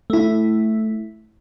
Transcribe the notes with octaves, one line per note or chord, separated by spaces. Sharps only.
A3 E4